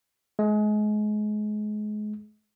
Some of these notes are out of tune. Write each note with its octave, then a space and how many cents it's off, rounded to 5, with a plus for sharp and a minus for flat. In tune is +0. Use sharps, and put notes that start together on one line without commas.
G#3 +30